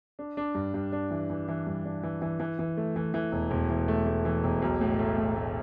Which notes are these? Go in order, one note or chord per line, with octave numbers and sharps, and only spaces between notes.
D4
D4
G2
G2
D4
E3
E3
E3
G2
D4
E3
E3
E3
E3
A3
E3
E3
E1
E1
E3
A3
A3
E3
E1
B1
A2
A3
A2
A3